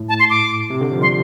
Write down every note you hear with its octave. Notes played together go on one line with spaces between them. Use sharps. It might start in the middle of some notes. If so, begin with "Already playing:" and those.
Already playing: A2
A5
C6
D6
C3
D3
F3
G3 C6